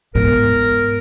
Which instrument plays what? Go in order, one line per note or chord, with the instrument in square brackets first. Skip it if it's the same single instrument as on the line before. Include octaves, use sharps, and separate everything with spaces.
[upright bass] G#2 B3 [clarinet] A#4